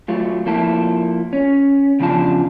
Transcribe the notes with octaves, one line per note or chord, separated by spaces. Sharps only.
F#3 A3 F4
F3 A#3 E4 A4
C#4
E2 C#3 F3 D4 F4 A5